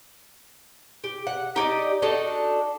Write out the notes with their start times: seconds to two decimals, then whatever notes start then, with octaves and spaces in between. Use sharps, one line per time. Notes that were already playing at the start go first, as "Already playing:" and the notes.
1.04 G4
1.27 F#5
1.56 D#4 G4 D5 D#5
2.02 D4 D#4 F#4 A4